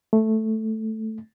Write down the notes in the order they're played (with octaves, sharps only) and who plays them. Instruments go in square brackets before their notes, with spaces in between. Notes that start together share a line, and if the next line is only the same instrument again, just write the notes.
[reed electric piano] A3